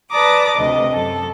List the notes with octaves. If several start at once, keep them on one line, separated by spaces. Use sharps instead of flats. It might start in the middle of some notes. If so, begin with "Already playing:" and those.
B4 D5 A5 A#5 D6 D#6
D2 C3 D#5
F#2 A4